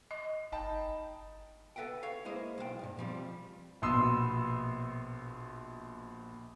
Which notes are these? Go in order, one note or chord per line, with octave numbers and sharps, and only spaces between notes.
D#5
G1 D#4 G5 A5 B5
A4 B4 E5 F#5 G5
C#5 F5
G#3 A#3 E4 C5 D#5
B1 C5 F5 G5
B1 G2 A#2
B2 F3 G3 C4
A#1 B2 B3 C6 D#6 E6